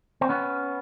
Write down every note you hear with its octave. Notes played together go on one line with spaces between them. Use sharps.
C4
B3 C#4